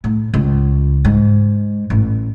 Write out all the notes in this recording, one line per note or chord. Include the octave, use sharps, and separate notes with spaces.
A2
C#2
G#2
A1